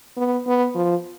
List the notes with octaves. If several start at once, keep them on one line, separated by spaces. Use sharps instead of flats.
B3
B3
F3